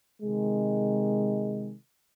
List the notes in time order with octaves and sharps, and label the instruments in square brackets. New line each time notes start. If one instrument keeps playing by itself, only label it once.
[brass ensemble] C3 D#3 G#3